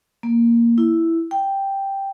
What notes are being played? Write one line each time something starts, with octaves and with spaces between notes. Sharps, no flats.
A#3
E4
G5